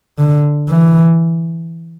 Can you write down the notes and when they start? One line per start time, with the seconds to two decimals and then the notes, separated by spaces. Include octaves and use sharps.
0.19 D3
0.69 E3